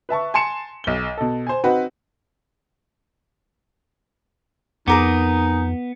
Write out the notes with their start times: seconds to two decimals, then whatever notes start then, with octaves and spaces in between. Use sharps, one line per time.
0.09 B4 E5 A5 C#6
0.34 G#5 A5 C6 C#7 E7
0.84 B1 G7
1.17 B2 A4
1.47 C5 G#5
1.64 C4 D#4 F#4 B4
4.88 F2 B3 D#4 G#4 A#4 D6